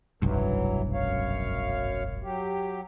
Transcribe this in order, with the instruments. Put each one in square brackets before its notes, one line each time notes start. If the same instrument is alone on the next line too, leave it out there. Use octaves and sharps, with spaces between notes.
[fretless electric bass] F1 B1 G2 [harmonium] E3 F#3
[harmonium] F#2 C#5 F5
F#3 G4